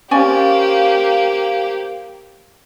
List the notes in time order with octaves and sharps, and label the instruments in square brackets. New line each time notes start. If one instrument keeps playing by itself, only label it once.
[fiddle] A#3 G4 [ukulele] C#4 D5 G#5 [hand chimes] C5 F5